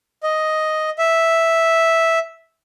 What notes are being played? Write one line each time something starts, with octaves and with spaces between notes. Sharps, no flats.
D#5
E5